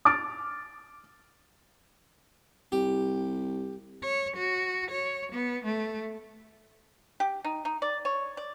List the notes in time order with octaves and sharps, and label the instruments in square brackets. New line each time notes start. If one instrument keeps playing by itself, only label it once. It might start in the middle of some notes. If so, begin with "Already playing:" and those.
[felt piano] D6 F6 A6 D7
[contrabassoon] C2 [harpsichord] G4
[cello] C#5
F#4
C#5
B3
A3
[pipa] G4
D#4
D#4
D5
C#5
D5